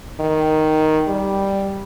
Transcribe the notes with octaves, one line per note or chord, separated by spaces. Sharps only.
D#3
G3